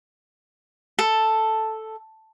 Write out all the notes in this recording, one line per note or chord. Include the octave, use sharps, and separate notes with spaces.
A4